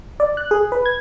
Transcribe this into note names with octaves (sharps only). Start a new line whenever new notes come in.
D5
F#6
G#4
B4
G#6